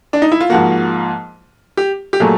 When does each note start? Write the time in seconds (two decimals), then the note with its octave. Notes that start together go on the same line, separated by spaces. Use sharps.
0.13 D4
0.22 D#4
0.32 E4
0.40 F4
0.50 G#2 F3 A#3 F#4
1.77 G4
2.13 G4
2.20 A#2 F#3 A3 G#4